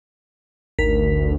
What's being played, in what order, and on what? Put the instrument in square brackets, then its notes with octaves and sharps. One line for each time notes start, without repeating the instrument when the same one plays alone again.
[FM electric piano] G#1 A#4 B6 [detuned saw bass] D2